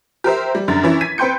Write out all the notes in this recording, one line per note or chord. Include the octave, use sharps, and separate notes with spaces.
G4 A#4 C5 E5
G3
F#2 D3 A#5 A6
E3 C#4 E4
G#6 B6 D#7
C4 B4 G5 C6 G6 C#7